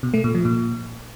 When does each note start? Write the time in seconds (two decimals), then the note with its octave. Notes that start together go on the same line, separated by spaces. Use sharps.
0.03 B2
0.14 A3
0.24 A#2
0.35 F3
0.45 A#2